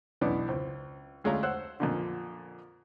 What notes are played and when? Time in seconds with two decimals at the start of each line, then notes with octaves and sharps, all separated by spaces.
0.21 B1 E3 B3 C#4 D4 D6
0.48 C#2 C4
1.24 D2 G#3 A3 C#4 F4 A#5
1.43 C5 C#5 F#5 E6 F#6
1.80 F2 A#2 D3